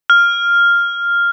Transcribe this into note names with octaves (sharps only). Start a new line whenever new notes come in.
F6